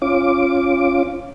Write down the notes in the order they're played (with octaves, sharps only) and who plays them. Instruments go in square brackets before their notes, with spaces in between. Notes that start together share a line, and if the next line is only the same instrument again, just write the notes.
[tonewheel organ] C#4 F4 D6